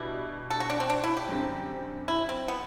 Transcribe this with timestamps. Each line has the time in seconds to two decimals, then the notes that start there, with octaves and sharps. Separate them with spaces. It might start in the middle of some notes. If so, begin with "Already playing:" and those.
Already playing: B2 G3 D4 E4
0.50 A4
0.60 F#4
0.70 D4
0.80 C4
0.90 D4
1.04 E4
1.17 G4
1.29 F#2 D3 G3 C4
2.08 E4
2.29 C4
2.48 B3